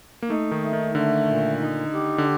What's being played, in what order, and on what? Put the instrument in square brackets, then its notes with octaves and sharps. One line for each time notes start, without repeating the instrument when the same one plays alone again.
[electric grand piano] A#3
[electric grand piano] A3 [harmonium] D#4
[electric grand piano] D#3
[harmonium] A3
[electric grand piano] D#3
[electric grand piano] D3 [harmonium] A3
[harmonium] A#2
D#4
G4
[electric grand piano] D3